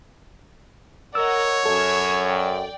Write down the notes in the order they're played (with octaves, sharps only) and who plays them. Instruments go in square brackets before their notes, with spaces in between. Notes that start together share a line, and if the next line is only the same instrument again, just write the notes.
[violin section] A#4 D#5 F#5 [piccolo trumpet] C#5 [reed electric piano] E6
[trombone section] F#2 [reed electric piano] A4 [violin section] E6 G#6
[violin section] D5 G5